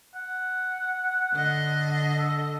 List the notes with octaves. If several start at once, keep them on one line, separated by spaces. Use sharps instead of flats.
F#5
D3 D#5
A4